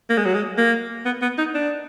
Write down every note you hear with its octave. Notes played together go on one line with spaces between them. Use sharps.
A#3
G#3
F#3
G#3
A#3
B3
B3
D#4
D4